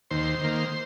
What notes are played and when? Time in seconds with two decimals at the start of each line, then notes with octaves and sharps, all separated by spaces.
0.11 D#2 C5
0.41 D#3 A#3